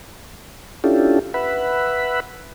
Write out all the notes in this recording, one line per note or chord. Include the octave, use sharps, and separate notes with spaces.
C#4 D4 E4 F4 G4 A4
B4 E5 F#5 B5